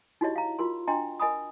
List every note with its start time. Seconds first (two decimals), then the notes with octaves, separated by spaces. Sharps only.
0.21 D#4 E4 F#4 G4 C#5 D#5
0.36 F5 A#5
0.59 F4 F#4 A#4 C6
0.87 D4 D#5 G5 A#5 C6
1.20 A#4 D#5 G#5 B5 D#6